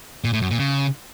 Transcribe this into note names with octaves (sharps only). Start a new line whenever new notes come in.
A#2
A2
F#2
A#2
C#3